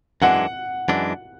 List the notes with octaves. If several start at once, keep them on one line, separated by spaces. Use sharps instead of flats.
F#2 E3 G#3 D4 F#5
F#2 E3 G#3 D4